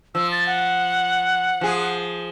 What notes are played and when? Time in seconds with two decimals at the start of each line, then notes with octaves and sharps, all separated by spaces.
0.15 F3 E6
0.32 A6
0.46 F#5
1.61 F3 G#4